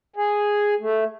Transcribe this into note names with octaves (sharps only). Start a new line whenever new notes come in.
G#4
A3